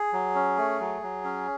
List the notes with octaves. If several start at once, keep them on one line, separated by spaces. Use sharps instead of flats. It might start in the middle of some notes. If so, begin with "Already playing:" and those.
Already playing: G#4
F#3
C#4
A3
F#3
F#3
C#4